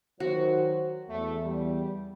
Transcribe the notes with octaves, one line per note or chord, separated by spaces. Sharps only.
D#3 F#3 F#4 C5
E2 A3
G3